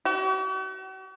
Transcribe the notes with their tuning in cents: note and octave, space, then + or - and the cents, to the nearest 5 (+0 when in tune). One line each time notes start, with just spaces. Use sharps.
F#4 +45